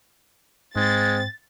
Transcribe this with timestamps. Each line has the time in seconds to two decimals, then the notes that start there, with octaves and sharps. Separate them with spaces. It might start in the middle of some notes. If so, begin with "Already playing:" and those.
0.76 G#2 G#3 C4 A6